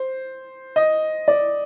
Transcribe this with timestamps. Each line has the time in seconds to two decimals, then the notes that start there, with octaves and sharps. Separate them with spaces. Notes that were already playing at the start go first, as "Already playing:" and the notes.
Already playing: C5
0.76 D#5
1.28 D5